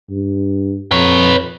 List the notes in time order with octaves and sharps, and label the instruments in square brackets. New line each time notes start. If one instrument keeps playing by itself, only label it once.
[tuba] G2
[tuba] F2 [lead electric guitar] B4 C#5